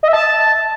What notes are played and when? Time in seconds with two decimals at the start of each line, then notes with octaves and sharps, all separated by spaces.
0.03 D#5
0.08 E5
0.13 A5